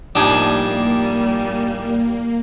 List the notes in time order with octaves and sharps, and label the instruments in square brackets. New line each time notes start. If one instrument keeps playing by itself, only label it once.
[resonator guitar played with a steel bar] A2 F3 G4 [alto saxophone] G3 [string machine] A#3 [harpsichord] D4 D#4 G#5